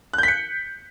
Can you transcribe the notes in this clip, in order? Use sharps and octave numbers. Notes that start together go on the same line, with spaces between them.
F#6 G6 B6 C#7